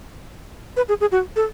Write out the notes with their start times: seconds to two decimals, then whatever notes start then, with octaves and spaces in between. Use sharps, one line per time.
0.77 B4
0.89 G#4
1.01 G#4
1.12 F#4
1.36 A4